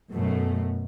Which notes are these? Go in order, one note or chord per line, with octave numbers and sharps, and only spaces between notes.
F#2 B2 A3